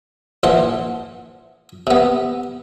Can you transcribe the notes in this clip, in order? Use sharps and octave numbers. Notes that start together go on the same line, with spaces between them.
A#1 E3 C5 F#5
C3 B3